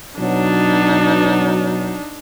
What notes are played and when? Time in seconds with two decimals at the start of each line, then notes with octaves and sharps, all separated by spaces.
0.19 B2 F#3 D4 D#4